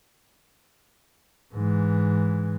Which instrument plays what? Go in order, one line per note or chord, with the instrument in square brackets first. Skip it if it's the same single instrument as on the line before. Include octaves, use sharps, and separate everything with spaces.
[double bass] G#2 E3